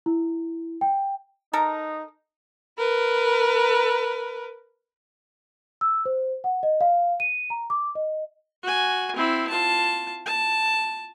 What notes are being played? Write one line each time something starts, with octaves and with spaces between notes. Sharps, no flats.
E4
G5
D#4 A4 A#4 A#5
A#4 B4
E6
C5
F#5
D#5
F5
D#7
A#5
D6
D#5
F#4 G#5
C4 E4
F4 A5
A5